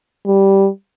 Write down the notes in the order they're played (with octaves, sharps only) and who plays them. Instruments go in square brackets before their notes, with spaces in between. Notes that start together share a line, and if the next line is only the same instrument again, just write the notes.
[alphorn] G3